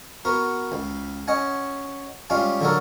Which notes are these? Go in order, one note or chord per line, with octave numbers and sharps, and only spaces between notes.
B3 F#4 A#4
C#2
C#4 D#5 F#5 G#5
G3 G#3 C#4 F4 G4
D3 F#3 D4 F#4 A4 A#4